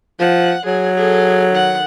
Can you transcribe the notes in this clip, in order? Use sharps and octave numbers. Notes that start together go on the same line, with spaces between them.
F3 F#5
F#3 G#4
G#4 A4
D#3 F#5